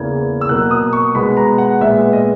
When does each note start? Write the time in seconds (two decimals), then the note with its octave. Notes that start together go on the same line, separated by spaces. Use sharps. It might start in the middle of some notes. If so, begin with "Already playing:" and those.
Already playing: E2 C#3 E3 A#3 G#6
0.41 E6
0.49 B2 F#3 A#3 F#6
0.71 D#6
0.93 C#6
1.15 B2 G#3 B3 B5
1.37 A#5
1.58 F#5
1.81 A#2 G#3 B3 E5
2.13 D#5